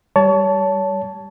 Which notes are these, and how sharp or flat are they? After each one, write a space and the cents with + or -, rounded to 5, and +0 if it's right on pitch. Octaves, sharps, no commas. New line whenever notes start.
G3 +0 C#5 +30 A5 +0